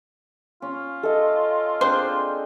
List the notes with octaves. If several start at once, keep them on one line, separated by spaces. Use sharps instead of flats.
C#4 F4
A4 D#5
C4 D4 G#4 C5